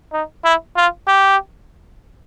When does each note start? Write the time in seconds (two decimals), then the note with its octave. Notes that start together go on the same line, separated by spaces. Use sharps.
0.13 D#4
0.44 E4
0.77 F4
1.08 G4